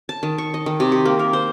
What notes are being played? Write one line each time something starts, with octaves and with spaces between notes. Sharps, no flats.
A5
D#3
C#6
D#5
D#3
C3
G4
A#3
A#4
C5